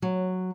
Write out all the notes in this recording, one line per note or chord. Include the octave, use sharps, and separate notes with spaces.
F#3